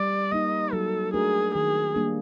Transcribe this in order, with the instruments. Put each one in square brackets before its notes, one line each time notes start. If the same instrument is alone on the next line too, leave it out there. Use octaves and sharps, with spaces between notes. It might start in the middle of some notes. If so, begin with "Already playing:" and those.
Already playing: [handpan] G3 [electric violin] D5
[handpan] A#3 D#4 [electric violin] D#5
[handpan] F#3 [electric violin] A4
[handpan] A3 D4 F#4 A#4 [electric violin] G#4
[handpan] D#3 [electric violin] G#4
[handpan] G3 A#3 D4